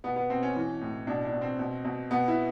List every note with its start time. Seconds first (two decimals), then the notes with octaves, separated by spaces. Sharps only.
0.04 B2 B3
0.16 B3
0.30 B2 C4
0.43 C#4
0.56 E3
0.81 A2
1.07 B2 D4
1.25 D4
1.33 B2
1.41 C4
1.59 B2
1.85 B2
2.10 B2 B3
2.28 E4